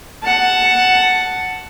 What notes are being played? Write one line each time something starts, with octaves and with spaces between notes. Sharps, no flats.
F#5 A5